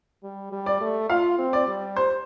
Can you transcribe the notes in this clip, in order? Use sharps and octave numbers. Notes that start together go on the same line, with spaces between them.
G3
G3
D5
A3
F4 F5
C4
D5
G3
C5